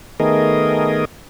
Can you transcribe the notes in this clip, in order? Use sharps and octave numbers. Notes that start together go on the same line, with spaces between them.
D#3 A3 B3 G#4 A#4 D#5